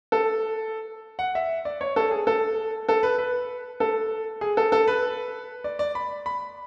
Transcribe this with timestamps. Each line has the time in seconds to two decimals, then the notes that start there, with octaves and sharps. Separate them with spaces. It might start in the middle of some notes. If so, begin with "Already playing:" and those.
0.12 A4
1.19 F#5
1.35 E5
1.65 D5
1.81 C#5
1.96 A4
2.11 G#4
2.27 A4
2.89 A4
3.03 B4
3.18 B4
3.80 A4
4.41 G#4
4.57 A4
4.72 A4
4.87 B4
5.64 D5
5.79 D5
5.95 B5
6.26 B5